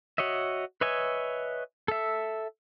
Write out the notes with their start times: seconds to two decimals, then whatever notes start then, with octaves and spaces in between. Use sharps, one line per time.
0.18 F#4 C#5 D#5 E5
0.81 B4 C#5 D#5 E5 G#5
1.88 A4 E5